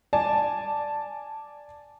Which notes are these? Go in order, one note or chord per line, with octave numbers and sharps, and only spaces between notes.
D5 G#5 A5